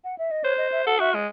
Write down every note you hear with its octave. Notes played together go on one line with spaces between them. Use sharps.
F#5
E5
D#5
C5 C#5
D#5
E5
A4 F#5
F#4 E5
G#3